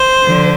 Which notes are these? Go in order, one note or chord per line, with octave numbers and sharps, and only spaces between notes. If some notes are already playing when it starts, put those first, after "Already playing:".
Already playing: C5
D3 F3